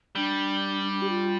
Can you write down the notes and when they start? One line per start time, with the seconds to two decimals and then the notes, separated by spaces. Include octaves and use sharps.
0.15 G3 D4
1.02 G4
1.09 F4